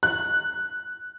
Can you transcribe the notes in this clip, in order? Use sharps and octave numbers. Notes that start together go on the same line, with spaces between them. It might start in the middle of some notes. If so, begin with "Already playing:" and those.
F#6